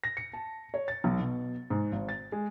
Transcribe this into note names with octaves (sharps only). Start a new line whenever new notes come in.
A#6
C#7
A5
C#5
A6
B1
B2
G#2
G#1
A6
G#3